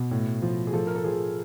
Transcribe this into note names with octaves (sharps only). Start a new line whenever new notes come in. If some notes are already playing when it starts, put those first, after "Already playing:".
Already playing: B2
A2
F3
G#4
F3 A4
A#4
A4
F3 G#4